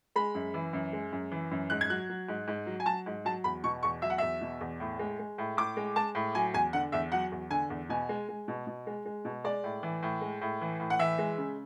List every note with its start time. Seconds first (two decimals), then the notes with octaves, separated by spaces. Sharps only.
0.16 G#3 B5
0.35 F#2
0.54 E3
0.73 F#2
0.93 G#3
1.12 F#2
1.31 E3
1.51 F#2
1.70 G#2 F#6
1.81 G#6
1.90 F#3 F#6
2.09 F#3
2.28 G#2
2.48 G#2
2.67 F#3
2.80 G#5
2.86 F#3 A5
3.06 G#2
3.25 F#3 A5
3.44 E2 B5
3.64 B2 C#6
3.83 E2 C#6
4.02 F#3 E5
4.10 F#5
4.18 E2 E5
4.41 B2
4.61 E2
4.80 A2
4.99 G#3
5.19 G#3
5.38 A2
5.57 A2 D6
5.77 G#3
5.96 G#3 A5
6.15 A2
6.35 F#3 G#5
6.54 E2 G#5
6.73 D3 F#5
6.92 E2 E5
7.12 F#3 F#5
7.32 E2
7.51 D3 G#5
7.70 E2
7.89 B2 G#5
8.09 G#3
8.29 G#3
8.48 B2
8.67 B2
8.87 G#3
9.06 G#3
9.25 B2
9.44 G#3 D5
9.64 A2
9.83 E3
10.03 A2
10.21 G#3
10.42 A2
10.61 E3
10.80 A2
10.90 F#5
10.99 E3 E5
11.19 G#3
11.38 C#3